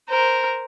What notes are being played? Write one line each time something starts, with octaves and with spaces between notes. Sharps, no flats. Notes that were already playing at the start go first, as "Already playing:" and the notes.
A#4 C5